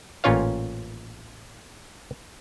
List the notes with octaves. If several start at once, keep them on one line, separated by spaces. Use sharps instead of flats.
A1 A#2 C#4 F4 C#5 F5